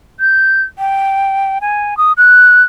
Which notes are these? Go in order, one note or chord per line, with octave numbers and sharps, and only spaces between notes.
G6
G5
G#5
D#6
F#6